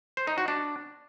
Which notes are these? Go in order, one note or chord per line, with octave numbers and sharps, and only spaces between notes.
C5
D#4
F#4
D4